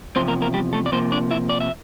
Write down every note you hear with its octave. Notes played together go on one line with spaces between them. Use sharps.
E2 C3 F3 C4 C5
A#3 A#4
A#3 A#4
G3 G4
A3 A4
D5
C3 F3 A#3 C4 C5
D4 D5
E4 E5
D5
E5